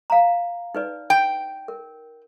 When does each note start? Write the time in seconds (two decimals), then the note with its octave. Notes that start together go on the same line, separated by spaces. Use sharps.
0.10 F5 A#5
0.75 D#4 B4 D5
1.10 G5
1.68 A#4